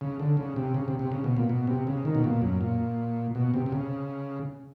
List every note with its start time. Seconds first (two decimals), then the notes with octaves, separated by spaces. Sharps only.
0.01 C#3
0.19 D3
0.37 C#3
0.56 C3
0.74 C#3
0.88 C3
0.99 C3
1.12 C#3
1.24 B2
1.37 A#2
1.49 B2
1.67 C3
1.87 C#3
2.05 D#3
2.15 B2
2.24 A#2
2.42 F#2
2.61 A#2
3.35 B2
3.54 C3
3.66 C3
3.72 C#3